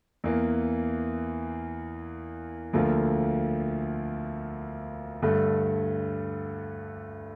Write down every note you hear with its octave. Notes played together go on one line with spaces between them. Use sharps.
E2 E3 A#3
D2 D3 F3 A#3 F4
G2 D3 A3